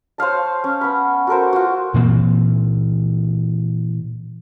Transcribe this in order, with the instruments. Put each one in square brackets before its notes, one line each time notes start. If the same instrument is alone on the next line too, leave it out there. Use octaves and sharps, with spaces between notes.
[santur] C5 C#5 F5 A5
C#4
B3 B5
F#4 A4 A#4 C5
F4 F#4
[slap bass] A#2 E3 A#3 C4